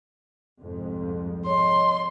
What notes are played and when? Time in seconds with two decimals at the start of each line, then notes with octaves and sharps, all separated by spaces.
0.60 C2 F2 G#2
1.46 C#5 D#5 C6